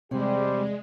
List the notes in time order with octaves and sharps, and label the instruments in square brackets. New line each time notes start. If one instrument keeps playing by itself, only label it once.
[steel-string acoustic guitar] E2 D5 [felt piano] C3 [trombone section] G3 G4 C5 [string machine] G#3